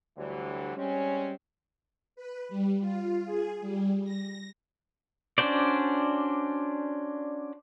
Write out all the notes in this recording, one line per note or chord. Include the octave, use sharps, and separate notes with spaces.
D2 D3 E3 F#3 G3
G3 G#3 C4 C#4
B4
G3
F4
G#4
G3
A#6
C#4 D4 F#4 C5 D5